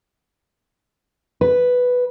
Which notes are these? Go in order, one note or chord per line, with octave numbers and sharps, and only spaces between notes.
B4